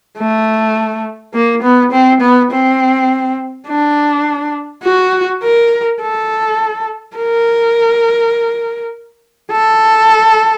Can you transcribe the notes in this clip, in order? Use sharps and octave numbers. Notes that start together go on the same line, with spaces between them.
A3
A#3
B3
C4
B3
C4
D4
F#4
A#4
A4
A#4
A4